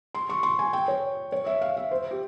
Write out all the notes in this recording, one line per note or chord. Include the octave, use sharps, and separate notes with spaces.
C6
C#6
C6
G#5
G5
C#5
C#5
E5
F5
E5
C5
G4